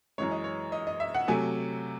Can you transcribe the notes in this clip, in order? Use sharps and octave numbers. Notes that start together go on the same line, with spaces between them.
F#2 E3 G#3 C#5
D#5
C#5
D#5
D#5
E5
F#5
C3 F#3 A3 G#5